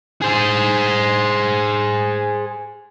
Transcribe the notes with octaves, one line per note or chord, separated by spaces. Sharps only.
G#4 C5